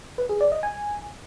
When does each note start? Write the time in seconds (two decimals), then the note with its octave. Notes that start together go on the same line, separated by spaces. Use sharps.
0.18 B4
0.29 G#4
0.41 D5
0.52 D#5
0.63 G#5